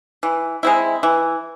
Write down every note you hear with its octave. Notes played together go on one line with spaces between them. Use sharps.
E3
G#3 C4 E4
E3